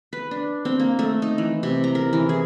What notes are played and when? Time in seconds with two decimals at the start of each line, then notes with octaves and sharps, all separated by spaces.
0.13 B4
0.31 D4
0.65 C4
0.80 A#3
0.99 A3
1.22 D#4
1.38 E3
1.63 C3
1.84 A#5
1.95 A#4
2.13 E3
2.29 G#4